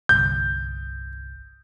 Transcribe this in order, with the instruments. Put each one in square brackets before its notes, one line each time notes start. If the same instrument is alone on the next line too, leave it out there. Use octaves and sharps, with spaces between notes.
[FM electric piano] G1 C2 [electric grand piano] G6